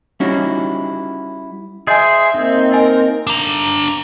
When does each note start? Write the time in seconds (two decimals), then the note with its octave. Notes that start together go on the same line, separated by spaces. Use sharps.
0.20 G3 C#4 D#4 E4 F#4
1.87 G#4 C5 D#5 E5 G#5
2.34 A#3 C4 D#4
2.72 A#4 D#5 G#5
3.27 D4 A#5